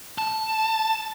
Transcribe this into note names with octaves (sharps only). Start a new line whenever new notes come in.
A5